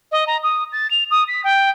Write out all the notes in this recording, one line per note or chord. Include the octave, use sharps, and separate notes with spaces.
D#5
A#5
D#6
A6
F7
D#6
B6
G5